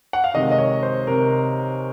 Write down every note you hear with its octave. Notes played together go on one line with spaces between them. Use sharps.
F#5
F5
C3 D#3 G#3 D#5
D#5
C#5
C5
C3 A#4